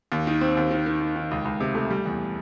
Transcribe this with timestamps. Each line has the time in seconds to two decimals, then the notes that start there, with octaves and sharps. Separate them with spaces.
0.12 D#2
0.27 D#3
0.41 C4
0.57 D#2
0.71 D#3
0.86 D#3
1.00 D#3
1.16 D#3
1.31 C#2
1.45 C#2
1.60 C3
1.75 A3
1.90 G3
2.06 E2